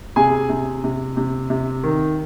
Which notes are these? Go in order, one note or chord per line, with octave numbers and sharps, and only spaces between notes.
C3 G#4 G#5
C3
C3
C3
C3
D#3